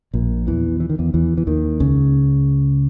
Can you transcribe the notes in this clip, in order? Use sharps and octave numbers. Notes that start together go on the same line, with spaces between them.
A#1 A#2
E2 E3
E3
D#3
E2 E3
E2 E3
E3
D#2 D#3
C#2 C#3